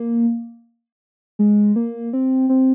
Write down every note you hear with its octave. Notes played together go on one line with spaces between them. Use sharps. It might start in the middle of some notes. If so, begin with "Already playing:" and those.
Already playing: A#3
G#3
A#3
C4
C4